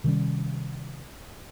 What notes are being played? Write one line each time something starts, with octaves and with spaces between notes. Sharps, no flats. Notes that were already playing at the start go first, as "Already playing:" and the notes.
C3 D#3 G3 C#4